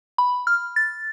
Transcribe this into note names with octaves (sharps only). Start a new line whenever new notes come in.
B5
F6
A6